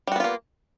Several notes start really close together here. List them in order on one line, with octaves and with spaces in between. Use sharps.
G3 F#4 B3 F4 A#3